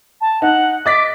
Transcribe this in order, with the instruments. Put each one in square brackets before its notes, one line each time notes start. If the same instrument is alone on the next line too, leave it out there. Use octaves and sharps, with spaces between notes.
[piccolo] A5
[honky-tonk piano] D#4 [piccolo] F#5
[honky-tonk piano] D#5 A6 B6 [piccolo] D6